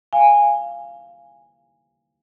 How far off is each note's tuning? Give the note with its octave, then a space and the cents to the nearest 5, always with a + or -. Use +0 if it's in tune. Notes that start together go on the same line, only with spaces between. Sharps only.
F5 -10 G#5 -15